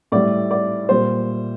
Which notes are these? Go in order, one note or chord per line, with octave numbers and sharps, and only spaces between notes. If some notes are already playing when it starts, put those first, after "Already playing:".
A2 G3 D5
D5
A#2 G3 C5